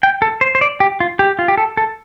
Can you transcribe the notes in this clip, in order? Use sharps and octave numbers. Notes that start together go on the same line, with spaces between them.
G5
A4
C5
C5
D5
G4
F4
G4
F4
G4
A4
A4